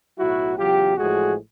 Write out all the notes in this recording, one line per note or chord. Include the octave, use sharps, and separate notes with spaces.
B1 A2 F#3 E4 F#4
E2 C#3 F#3 F4 G4
A1 A2 F3 G#3 F#4 G#4